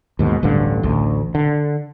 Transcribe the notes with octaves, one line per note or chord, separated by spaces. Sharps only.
D#2 G#2 B2
D1 A1 G2 D3
A1 D2
D3